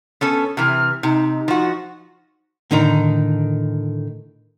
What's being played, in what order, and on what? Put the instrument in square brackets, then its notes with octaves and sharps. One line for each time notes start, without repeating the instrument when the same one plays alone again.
[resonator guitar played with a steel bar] B3 C#4 A4
[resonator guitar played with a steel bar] C3 E3 [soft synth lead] F6
[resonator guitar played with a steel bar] C3 [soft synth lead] D#4
[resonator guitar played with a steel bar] F3 F#4
[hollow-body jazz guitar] A2 D3 D#3 D#4